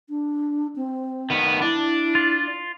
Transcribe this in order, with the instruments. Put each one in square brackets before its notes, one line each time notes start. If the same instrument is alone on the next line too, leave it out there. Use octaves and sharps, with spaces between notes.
[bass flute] D4
C4
[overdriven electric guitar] D#3 B3
[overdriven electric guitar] D4 [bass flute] E4
[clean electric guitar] F4